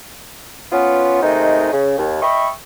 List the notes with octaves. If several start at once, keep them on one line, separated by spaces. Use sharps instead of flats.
B3 C#4 F4
C3 D#3 G#3 A3 D#4
C#3
D#2
D#5 E5 G5 B5 C#6